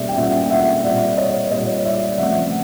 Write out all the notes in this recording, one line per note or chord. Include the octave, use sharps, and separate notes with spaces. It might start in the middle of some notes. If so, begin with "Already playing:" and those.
Already playing: B2 G3 A#3 C#4 D5 E5
G5
B2 G3 A#3 C#4 E5 F#5
G5
E5 F#5
A#2 G3 C4 D5 E5
C#5 D#5
A#2 G3 C4 C#5 D#5
D5 E5
C#3 F3 A3 C4 E5 F#5